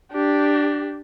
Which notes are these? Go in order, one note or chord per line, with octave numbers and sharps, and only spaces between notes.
D4 G4